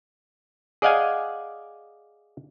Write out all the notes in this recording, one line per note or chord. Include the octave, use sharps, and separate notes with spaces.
G#4 D5 D#5 F5 F#5 G#5